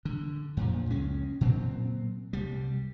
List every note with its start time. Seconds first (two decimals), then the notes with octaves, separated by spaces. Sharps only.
0.05 D3
0.57 F2 A#2 F3
0.90 C#2 G#3 C#4
1.41 A#2 F#3 A3 C4
2.33 C2 G3